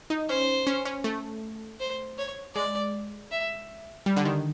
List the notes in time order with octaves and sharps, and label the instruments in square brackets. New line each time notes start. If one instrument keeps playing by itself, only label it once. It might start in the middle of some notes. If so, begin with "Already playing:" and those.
[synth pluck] D#4
[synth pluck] C#4 [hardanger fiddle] C5
[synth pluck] C#4
C#4
A3
[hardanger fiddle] C5
C#5
[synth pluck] G#3 [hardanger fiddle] D5
[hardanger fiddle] E5
[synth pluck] G3
D3
D#3